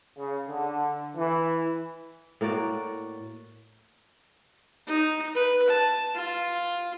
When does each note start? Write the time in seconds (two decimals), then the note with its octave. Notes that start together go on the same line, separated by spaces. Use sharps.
0.18 C#3
0.48 D3
1.17 E3
2.41 A2 A#3 F#4 D5
4.87 D#4
5.35 B4
5.70 A5
6.15 F4